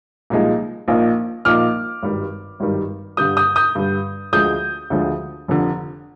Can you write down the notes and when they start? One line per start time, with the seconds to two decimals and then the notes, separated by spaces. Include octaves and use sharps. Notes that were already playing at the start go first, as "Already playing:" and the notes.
0.30 C2 A#2 F3 G#3 D#4
0.88 A#1 A#2 F3 A#3 D#4
1.45 A#1 A#2 F3 A#3 D#4 D6 F6
2.02 G#1 G2 D#3 G3
2.60 G#1 G2 D#3 G3
3.17 G2 D3 G3 D#6 G6
3.37 D#6 G6
3.56 D#6 G6
3.75 G2 D3 G3
4.33 D2 D3 F3 G#3 D#6 G6
4.90 D2 D3 F3 G#3
5.48 F1 F2 D3